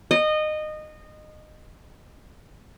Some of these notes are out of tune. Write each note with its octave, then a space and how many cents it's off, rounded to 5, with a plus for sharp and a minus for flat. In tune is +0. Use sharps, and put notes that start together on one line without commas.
D#5 -20